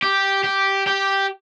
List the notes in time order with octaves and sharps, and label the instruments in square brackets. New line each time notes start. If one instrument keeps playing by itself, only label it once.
[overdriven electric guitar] G4
G4
G4